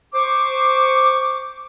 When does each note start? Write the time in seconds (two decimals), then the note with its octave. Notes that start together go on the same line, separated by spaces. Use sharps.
0.15 C5 C#6 D6